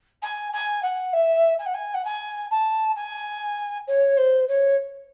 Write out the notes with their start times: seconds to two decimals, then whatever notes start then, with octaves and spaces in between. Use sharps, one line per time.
0.22 G#5
0.52 G#5
0.82 F#5
1.13 E5
1.58 G#5
1.66 F#5
1.74 G#5
1.94 F#5
2.04 G#5
2.50 A5
2.95 G#5
3.87 C#5
4.17 C5
4.48 C#5